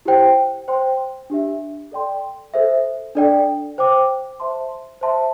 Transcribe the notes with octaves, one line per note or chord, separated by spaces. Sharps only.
E4 G4 C5 G5
C5 G5 C6
D4 G4 E5
A4 D5 G5 C6
A4 C5 E5
D4 A4 D5 G5
C5 G5 D6
C5 E5 A5 C6
C5 E5 A5 C6